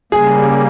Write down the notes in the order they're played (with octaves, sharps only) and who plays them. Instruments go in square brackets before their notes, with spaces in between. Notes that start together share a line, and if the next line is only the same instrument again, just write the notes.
[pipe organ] C#3 G3 A#3 [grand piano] G#4